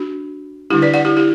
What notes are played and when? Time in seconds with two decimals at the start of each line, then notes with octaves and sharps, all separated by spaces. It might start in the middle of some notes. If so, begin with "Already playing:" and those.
Already playing: D4 F#4
0.70 D3 G3 D4 E4 G4
0.82 B4 D5
0.94 D5 F#5
1.05 E4 G4
1.17 E4 G4